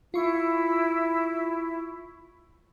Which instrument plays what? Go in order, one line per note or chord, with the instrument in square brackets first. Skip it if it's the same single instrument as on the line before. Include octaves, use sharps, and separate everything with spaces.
[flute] E4 [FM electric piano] F4 C#6